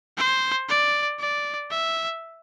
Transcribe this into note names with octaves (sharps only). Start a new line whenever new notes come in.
C5
D5
D5
E5